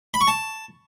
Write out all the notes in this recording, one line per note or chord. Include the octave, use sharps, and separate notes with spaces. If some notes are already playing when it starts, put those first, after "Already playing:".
B5
C#6
A5